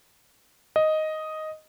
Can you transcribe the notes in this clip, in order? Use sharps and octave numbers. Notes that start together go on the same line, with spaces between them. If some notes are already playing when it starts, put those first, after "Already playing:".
D#5